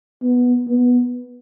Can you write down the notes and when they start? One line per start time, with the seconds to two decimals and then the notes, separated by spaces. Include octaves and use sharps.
0.22 B3
0.67 B3